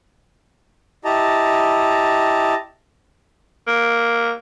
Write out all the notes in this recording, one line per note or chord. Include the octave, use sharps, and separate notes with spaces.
E4 G4 D#5 A5 A#5
A#3